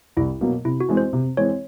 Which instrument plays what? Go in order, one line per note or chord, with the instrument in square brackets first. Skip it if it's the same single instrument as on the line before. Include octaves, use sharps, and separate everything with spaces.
[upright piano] C2 [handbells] E4
[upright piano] B2 F#3 A#3
[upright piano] C3 [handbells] E4
[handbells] F#4
[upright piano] E3 G#3 C4
[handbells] C5
[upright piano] C3
[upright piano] E3 G#3 C4 [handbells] C#5